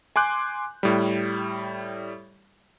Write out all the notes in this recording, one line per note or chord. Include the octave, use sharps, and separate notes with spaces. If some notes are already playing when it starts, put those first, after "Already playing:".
G#5 C6 D6 F#6 G6
A2 G3